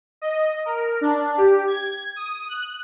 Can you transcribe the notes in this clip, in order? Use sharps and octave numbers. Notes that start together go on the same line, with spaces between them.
D#5
A#4
D4
G4
G#6
D#6
F#6